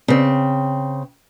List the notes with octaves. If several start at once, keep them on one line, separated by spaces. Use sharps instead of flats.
C#3 C4